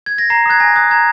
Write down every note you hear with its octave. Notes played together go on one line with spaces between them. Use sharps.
G#6
A#6
A#5 C7
D#6 F#6 G#6
G#5 A#6
D#6 F#6 G#6
A#5 G#6